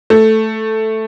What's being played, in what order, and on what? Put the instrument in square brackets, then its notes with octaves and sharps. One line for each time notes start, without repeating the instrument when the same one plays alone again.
[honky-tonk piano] A3